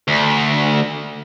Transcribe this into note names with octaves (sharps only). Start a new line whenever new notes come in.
D2